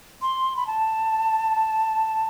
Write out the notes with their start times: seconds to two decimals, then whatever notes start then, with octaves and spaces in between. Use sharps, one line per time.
0.22 C6
0.57 B5
0.67 A5